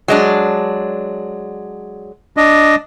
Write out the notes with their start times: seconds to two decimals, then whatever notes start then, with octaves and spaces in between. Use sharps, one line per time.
0.08 F#3 G#3 D4
2.37 D4 D#5